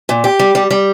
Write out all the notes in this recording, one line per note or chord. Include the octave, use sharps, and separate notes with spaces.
A#2
G4
G3
G3
G3